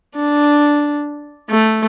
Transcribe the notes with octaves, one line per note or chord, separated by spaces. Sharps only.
D4
A3